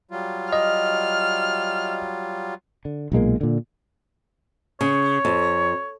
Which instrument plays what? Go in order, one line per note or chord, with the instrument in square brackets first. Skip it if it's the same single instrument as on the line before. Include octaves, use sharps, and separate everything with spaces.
[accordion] F#3 G3 F4
[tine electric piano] D#5 [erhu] F6
[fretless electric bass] D3
B1 A#2 G#3 A#3
A#2 D3
[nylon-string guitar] C#3 [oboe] C#5
[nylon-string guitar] F2